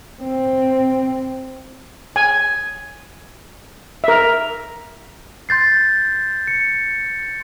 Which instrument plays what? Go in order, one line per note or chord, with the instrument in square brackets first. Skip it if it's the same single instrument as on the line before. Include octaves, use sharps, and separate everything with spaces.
[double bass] C4
[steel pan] G#5
A#4 E5
[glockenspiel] C6 G6 A6 C7
C#7